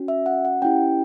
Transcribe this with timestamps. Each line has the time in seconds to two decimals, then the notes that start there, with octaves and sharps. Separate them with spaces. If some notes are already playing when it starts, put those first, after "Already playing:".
Already playing: C#4 F#4
0.08 E5
0.26 F#5
0.45 F#5
0.62 C#4 E4 G4 G5